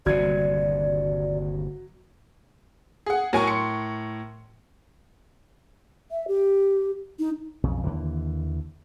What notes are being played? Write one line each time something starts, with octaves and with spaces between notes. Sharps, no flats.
G1 D#2 C3 F#3 D5 G#6
G#4 F#5
A2 F#3 A#4 G#5 C#6
C6 C#7
E5
G4
D#4
B1 F2 C#3
D#2 D3 E3